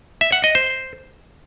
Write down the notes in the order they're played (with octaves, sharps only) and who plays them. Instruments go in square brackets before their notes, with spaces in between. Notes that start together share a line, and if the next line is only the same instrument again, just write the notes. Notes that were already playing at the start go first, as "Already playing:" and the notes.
[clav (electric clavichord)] E5
F#5
D#5
C5